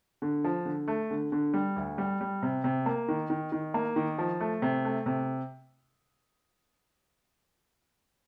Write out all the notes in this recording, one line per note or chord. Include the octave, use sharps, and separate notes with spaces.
D3
F3
D3
A3
D3
D3
G3
D2
G3
G3
C3
C3
A#3
D#3
D#3
D#3
A#3
D#3
F3
A3
C3
A3
C3